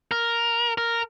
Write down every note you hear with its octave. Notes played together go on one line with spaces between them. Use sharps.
A#4
A#4